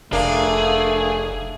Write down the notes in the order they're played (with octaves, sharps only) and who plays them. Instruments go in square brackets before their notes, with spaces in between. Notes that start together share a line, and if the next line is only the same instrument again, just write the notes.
[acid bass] F1 [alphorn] A3 [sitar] A#3 D4 [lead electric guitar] G#4